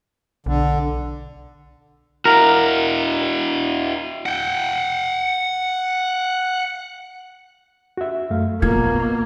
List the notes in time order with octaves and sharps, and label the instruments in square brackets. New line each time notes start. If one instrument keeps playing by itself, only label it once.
[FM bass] B1 [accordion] D3
[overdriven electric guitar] E4 F#4 [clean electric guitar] A#4
[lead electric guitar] F#5 G5
[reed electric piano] F#4 E5
F#2 A3 F5
[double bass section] B2 A#3 [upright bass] F4 [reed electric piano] G#6